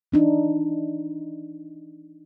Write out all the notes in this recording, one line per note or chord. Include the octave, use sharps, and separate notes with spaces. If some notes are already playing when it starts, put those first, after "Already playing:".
E3 D4 D#4